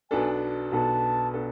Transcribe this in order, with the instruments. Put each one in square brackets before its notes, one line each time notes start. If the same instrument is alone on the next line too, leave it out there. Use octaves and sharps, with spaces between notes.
[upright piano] B1 B2 B3 D4 A4 [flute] G#5
[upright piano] B1 B2 B3 D4 A4 [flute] A5
[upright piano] B2 B3 D4 A4